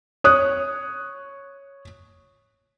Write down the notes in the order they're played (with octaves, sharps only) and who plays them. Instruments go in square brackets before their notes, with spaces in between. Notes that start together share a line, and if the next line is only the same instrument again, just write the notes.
[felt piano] C#5 D#6 F#6